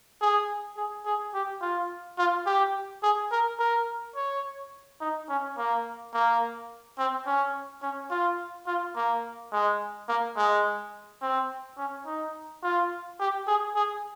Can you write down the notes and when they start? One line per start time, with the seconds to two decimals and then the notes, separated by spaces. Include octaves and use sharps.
0.21 G#4
0.77 G#4
1.05 G#4
1.34 G4
1.62 F4
2.18 F4
2.46 G4
3.03 G#4
3.31 A#4
3.59 A#4
4.16 C#5
5.00 D#4
5.29 C#4
5.57 A#3
6.14 A#3
6.98 C4
7.26 C#4
7.82 C#4
8.10 F4
8.67 F4
8.96 A#3
9.52 G#3
10.08 A#3
10.36 G#3
11.22 C4
11.78 C#4
12.06 D#4
12.63 F4
13.20 G4
13.47 G#4
13.75 G#4